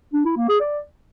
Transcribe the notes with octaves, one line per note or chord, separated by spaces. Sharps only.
D4
E4
A#3
G#4
D5